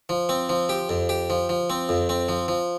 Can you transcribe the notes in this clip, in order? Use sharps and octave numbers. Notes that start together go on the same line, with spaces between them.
F3
C4
F3
G4
F2
G4
F3
F3
C4
F2
C4
F3
F3